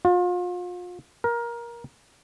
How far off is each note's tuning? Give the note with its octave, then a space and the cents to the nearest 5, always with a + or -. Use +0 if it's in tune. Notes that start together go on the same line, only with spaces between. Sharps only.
F4 +35
A#4 +20